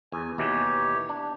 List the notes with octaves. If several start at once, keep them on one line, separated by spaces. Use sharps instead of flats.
E2 G#5
D#2 B2 E3 G4 C#5
D4